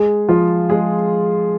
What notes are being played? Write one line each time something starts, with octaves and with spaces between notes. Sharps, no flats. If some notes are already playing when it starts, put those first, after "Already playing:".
Already playing: G#3 G#4
F3 F4
G#3 G#4